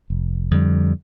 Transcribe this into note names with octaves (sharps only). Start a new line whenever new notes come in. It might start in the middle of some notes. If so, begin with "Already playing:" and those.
F1
F2 D3 G3